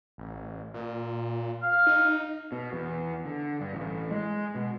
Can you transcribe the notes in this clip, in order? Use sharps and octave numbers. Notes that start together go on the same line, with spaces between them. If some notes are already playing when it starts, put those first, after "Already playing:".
A1
A#2
F5
D#4
B2
E2
D3
G2
A1
G#3
B2